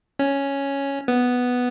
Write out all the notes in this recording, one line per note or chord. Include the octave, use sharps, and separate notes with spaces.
C#4
B3